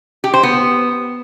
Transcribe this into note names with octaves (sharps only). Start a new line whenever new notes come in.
G4
C5
B3